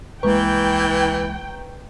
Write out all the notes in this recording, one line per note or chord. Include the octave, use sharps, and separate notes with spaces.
C2 E3 G#3 A#3 B4 G5 A#5 C#6